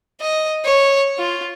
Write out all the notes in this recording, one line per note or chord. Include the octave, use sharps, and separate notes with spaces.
D#5
C#5
F4